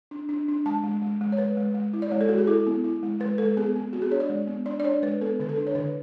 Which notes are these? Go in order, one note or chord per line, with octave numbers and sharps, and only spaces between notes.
D4
D4
D4
G#3 A5
G#3
G#3
G#3
C#5
G#3 B4
G#3
G#3
E4
D5
G#3 C#5
A4
G#3 F#4
G#4
E4 A4
B3
E4
G#3
G#3 B4
G#3 A4
B3 G#4
B3
B3 F#4
G#4
D4 C#5
D5
G#3
B3
D4 D5
D5
D4 C#5
G#3 B4
B3 A4
D3 B4
A4
D4
C#5
D3 B4